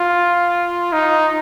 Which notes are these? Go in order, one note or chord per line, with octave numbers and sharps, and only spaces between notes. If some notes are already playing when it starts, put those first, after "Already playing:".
Already playing: F4
D#4